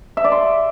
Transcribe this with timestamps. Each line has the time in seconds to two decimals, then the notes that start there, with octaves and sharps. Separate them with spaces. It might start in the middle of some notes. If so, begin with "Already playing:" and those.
0.17 E5
0.24 D5
0.32 C6